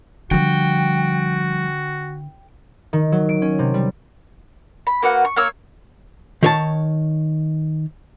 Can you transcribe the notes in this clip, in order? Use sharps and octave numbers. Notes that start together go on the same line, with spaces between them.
D3 F3 G3 F#4 G5
D#3
F#3
D7
C#4
C3
G3
B5
A#3 F#4 B4 F#5
C#6
A#3 C#5 C#6 E6
D#3 C#5 A5